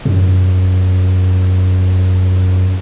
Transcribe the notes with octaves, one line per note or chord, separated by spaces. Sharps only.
F#2